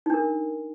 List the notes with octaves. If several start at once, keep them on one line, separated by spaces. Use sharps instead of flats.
D4 D#4 A#4